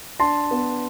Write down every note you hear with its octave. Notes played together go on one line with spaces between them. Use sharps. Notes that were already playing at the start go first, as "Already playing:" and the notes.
D4 A5 C6
B3